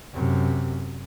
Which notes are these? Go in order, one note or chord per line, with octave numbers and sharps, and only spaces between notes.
F#2 C3